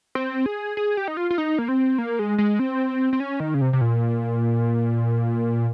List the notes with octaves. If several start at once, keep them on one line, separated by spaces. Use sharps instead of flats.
C4
G#4
G#4
G4
D#4
F4
F4
D#4
A#3
C4
A#3
G#3
G#3
C4
C4
C#4
D#3
C#3
C3
C3
A#2